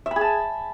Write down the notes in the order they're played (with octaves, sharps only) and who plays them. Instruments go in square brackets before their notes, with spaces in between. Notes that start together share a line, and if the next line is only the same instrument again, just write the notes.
[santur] E5
B5
G#4
A5